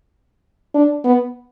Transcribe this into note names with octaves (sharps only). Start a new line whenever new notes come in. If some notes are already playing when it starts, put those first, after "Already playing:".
D4
B3